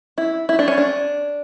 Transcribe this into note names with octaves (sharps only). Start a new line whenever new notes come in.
E4
E4
D4
C#4
D4